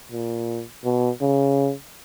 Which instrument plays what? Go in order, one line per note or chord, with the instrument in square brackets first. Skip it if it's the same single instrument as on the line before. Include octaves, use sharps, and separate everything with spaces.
[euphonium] A#2
B2
C#3